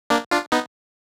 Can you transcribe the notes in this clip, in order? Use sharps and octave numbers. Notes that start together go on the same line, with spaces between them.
A#3 D4
D4 F4
B3 D#4